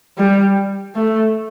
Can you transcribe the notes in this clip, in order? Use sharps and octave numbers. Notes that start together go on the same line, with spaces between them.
G3
A3